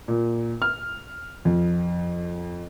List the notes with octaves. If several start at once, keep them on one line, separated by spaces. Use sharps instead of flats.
A#2
F6
F2